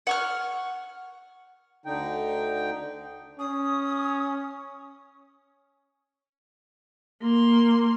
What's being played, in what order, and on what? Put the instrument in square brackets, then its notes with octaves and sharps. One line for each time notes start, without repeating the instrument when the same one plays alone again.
[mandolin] F#5 C#6 F6
[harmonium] D2 D3 D#4 G5
[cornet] C#4 [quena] D#6
[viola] A#3 C6